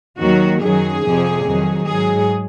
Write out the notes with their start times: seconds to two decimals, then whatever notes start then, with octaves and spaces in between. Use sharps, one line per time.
0.19 D#2 D#3 F#3 F#4
0.61 F#2 D#3 F#3 G#4
1.03 F2 C3 F3
1.45 F2 D#3 F#3
1.87 G#2 F#3 G#4